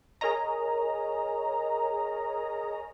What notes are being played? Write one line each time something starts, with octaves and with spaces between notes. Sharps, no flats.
G#4 A#4 C#5 D#5 A#5